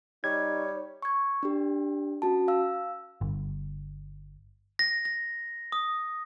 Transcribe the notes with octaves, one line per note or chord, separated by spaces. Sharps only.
G3 D#4 C#5 G#6
C#6 G#6
D4 G4
C#4 F#4 A5
F5 E6
G1
A#6
A#6
D#6